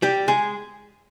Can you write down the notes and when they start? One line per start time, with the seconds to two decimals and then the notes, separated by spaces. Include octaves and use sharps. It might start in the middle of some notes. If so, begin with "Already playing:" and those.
0.02 G3 G4
0.28 G#3 G#4